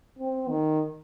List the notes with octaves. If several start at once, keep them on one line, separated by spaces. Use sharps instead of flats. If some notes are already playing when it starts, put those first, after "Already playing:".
C4
D#3